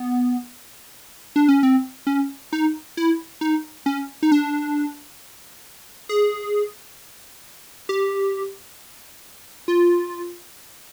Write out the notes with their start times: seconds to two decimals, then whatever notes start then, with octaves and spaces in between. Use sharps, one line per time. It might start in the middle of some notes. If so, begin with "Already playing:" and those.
Already playing: B3
1.36 D4
1.49 C#4
1.63 C4
2.07 C#4
2.53 D#4
2.97 E4
3.41 D#4
3.86 C#4
4.23 D#4
4.32 D4
6.09 G#4
7.89 G4
9.68 F4